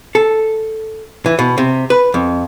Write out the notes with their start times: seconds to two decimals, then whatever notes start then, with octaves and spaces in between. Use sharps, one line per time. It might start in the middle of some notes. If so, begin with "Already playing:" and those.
0.15 A4
1.26 E3
1.39 B2
1.58 C3
1.90 B4
2.14 F2